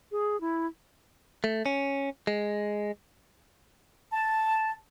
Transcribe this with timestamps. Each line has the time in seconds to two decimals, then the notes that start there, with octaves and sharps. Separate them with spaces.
0.11 G#4
0.41 E4
1.44 A3
1.66 C#4
2.27 G#3
4.12 A5